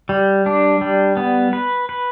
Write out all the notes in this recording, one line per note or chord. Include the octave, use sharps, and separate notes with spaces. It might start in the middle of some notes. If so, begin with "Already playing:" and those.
G3
D4
G3
B3
B4
B4